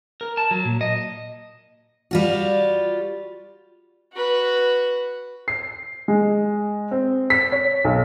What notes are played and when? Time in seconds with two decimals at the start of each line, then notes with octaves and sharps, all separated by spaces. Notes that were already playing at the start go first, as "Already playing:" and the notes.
0.21 A#4
0.37 A5
0.51 F#3
0.65 A#2
0.81 D#5
2.11 G3 F4 F#4
4.13 F#4 B4
5.48 C7
6.08 G#3
6.91 C4
7.30 B6
7.52 C#5
7.84 B1